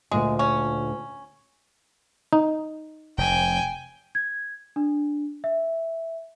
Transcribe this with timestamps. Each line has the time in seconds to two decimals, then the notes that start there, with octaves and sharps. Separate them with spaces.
0.11 D2 A#2 D3 G#3
0.39 C#4
2.33 D#4
3.18 F1 G5 G#5
4.15 G#6
4.76 D4
5.44 E5